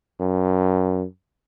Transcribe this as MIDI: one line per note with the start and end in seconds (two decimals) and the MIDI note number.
0.20 1.04 42